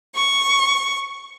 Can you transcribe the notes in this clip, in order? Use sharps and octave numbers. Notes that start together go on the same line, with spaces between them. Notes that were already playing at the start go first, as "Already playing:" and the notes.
C#6